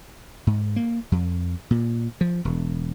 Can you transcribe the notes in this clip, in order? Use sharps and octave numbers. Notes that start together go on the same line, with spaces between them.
G#2
A#3
F2
A#2
F3
E1